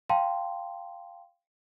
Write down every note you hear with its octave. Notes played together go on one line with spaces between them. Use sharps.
F5 G5 A5 C6